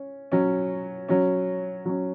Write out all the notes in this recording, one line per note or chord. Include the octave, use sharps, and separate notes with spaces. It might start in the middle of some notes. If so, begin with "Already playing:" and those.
Already playing: C#4
F#3 C#4
F#3 C#4
F#3 C#4